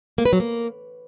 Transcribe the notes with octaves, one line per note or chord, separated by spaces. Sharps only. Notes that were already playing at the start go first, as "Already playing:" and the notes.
A#3
B4
F#3
A#3